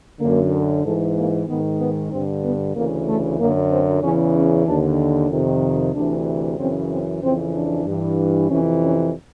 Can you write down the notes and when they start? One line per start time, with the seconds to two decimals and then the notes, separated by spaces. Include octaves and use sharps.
0.19 F#2 D3 A#3
0.83 G#2 E3 A3
1.16 A#3
1.47 G#2 D#3 B3
1.79 B3
2.11 G2 D3 C4
2.42 B3
2.75 D2 C#3 E3 A#3
3.06 A3
3.39 F#2 D3 A#3
3.70 C4
4.02 E2 C#3 E3 C#4
4.35 C#4
4.66 D#2 D3 D4
5.30 F2 C3 D#3
5.94 D2 C3 E3 D4
6.58 F#2 C#3 E3 C4
6.90 C4
7.22 F2 C#3 E3 C4
7.54 D4
7.86 G2 E3
8.49 F2 C3 E3 C#4
8.82 C#4